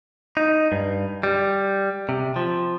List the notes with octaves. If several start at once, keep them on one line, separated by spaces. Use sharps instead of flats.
D#4
G2
G3
C3
F3